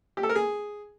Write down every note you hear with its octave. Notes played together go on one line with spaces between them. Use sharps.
G4
A4
A#4
G#4